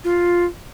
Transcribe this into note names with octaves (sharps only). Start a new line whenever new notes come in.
F4